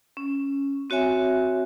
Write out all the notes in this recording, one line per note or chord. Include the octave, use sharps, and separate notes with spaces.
C#4
C4 F#4 C#5 E5 G#5